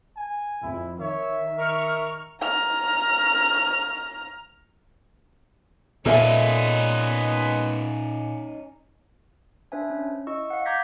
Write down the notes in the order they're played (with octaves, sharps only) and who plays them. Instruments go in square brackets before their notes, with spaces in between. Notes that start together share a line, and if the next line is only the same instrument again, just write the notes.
[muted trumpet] G#5
[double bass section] F2 [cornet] E4
[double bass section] D#3 [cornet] C#5 [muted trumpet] E5
[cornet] A#4 [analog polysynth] C#6 F6
[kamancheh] A#5 F6
[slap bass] A#2 [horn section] G#3 B3 [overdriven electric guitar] C#4 D#4 [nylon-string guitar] A4 E5 G#5
[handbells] D4 B4 C5 E5 G#5
C#4
E4 D#5 C#6 E6
F5 F#5
A#5 D6 G6 G#6 A#6 B6